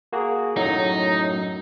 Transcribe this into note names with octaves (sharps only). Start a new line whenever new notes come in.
A#3 F#4 G#4
F#2 A2 F#3 D#4